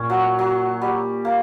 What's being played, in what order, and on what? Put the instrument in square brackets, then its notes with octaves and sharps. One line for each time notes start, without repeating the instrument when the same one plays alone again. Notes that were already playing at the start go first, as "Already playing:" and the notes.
Already playing: [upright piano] A#2 [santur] C#4
[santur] F#3
F#3
G3
A#3